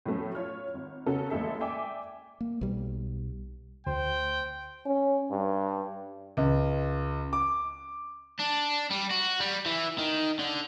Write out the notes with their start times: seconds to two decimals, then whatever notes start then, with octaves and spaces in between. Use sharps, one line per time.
0.06 A2 F3 F#3 A3 C#4
0.35 F4 C#5 F6
0.74 G#1
1.06 C#3 C#4 F#4 A4 A#4
1.30 A1 G#3 A#3 A4 E5
1.60 D5 E5 G5 G#5 D6
2.41 A#3
2.61 B1 G3
3.87 D2 C5 G5
4.86 C#4
5.31 G2
6.37 C#2
7.33 D6
8.39 D4
8.91 G3
9.10 F#4
9.40 G3
9.66 E3
9.98 D#3
10.39 D3